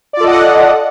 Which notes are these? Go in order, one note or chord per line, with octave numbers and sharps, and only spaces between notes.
F4 A4 D5 D#5 F#5